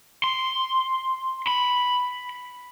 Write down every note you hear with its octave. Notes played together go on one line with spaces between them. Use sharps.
C6
B5